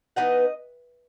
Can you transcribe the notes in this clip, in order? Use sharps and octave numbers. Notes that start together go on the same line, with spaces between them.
E3 B3 D#4 D#5 F#5